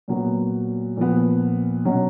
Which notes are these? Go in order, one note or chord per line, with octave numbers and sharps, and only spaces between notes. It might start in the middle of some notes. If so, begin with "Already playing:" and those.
A#2 F#3 B3
A#2 F3 B3
B2 F#3 C#4